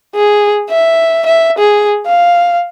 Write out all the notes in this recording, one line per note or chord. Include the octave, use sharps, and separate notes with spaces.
G#4
E5
E5
G#4
F5